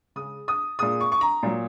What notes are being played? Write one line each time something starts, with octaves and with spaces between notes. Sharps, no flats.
C#3 G#3 D#6
D#6
A#2 G#3 D#6
C#6
C#6
A#5
A#2 F#3